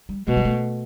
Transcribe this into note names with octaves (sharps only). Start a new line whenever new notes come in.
G3
B2 A3
G3
A3